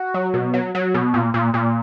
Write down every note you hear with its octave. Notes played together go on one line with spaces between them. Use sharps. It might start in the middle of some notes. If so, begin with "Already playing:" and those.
Already playing: F#4
F#3
B2
F#3
F#3
B2
A#2
A#2
A#2